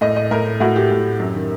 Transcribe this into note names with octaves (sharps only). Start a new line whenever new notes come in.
A2 D#5
D#5
A2 A#4
A2 F#4
G4
A2
F#2
D#3